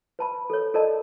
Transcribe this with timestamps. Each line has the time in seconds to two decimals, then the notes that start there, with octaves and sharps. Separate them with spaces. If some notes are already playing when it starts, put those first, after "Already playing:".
0.19 B4 A5 B5
0.50 A4 A#4 C#5
0.74 A4 A#4 D5 D#5 A5